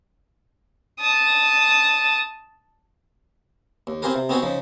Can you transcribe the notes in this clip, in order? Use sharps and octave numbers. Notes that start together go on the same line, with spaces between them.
A5 D#6
D#2
C4 F4 G4 G#4 A#4 B4
C3
B3 C4 D#4 F#4 G#4 B4
C#3 F3 D#4